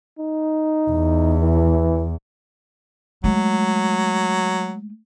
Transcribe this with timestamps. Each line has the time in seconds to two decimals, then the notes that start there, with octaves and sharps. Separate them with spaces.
0.19 D#4
0.90 E2
1.42 E3
3.24 F#3 G#3 A3